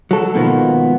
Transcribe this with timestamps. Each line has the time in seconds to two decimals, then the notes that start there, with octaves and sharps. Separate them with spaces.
0.11 F#3 A4
0.34 G#2 B2 D#3 F3 A#3 B3